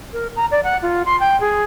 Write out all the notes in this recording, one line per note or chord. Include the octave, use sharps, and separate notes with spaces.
A#4
A#5
D5
F#5
F4
C6
G5
G#4